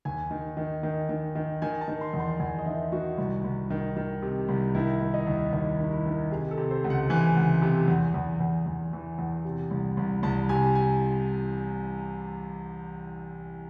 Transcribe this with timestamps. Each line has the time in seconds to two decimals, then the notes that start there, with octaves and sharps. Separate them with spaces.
0.05 D#2 G#5
0.31 D#3
0.57 D#3
0.83 D#3
1.09 D#3
1.35 D#3
1.62 D#3 G#5
1.81 A5
1.88 D#3
2.01 C6
2.14 E2
2.20 C6
2.40 E2 G#5
2.58 D#5
2.66 D#3 E5
2.92 D#3 F#4
3.18 C2
3.44 C2
3.70 D#3
3.97 D#3
4.22 C3
4.49 C2
4.75 D#3 E4
5.01 D#3
5.14 D#4
5.27 D#2
5.53 D#2 D#4
5.79 D#3
5.93 E4
6.06 D#3
6.31 C3 G#4
6.51 A4
6.58 C3
6.71 C5
6.84 C#2
6.90 F#5
7.10 E3 G#5
7.36 C#2
7.62 C3
7.88 E2
8.14 E2
8.40 E2
8.66 E2
8.93 E3
9.19 E2
9.45 C3
9.71 C2
9.97 C2
10.23 C2 A5
10.49 C3 G#5
10.75 G#5